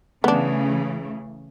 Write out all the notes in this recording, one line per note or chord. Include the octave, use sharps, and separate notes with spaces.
C#3 E3 A3 B3 D4